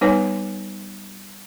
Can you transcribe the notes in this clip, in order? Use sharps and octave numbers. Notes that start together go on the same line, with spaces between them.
G3 B3 D#4 B4 C#5 G#5